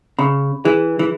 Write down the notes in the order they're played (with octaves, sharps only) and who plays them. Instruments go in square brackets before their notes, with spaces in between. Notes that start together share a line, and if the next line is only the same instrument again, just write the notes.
[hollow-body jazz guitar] C#3 [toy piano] B5
[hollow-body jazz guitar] E3 [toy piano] G#4
[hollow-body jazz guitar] E3